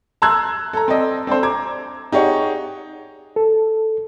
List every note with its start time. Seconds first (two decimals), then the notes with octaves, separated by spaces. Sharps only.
0.22 A5 A#5 C6 E6 F#6 G#6
0.73 A4 A#5
0.88 C4 A4 D5 D#5
1.27 C4 D4 A4 C5
1.43 A#5 D6 G#6
2.12 D#4 G4 G#4 C#5 F#5
3.36 A4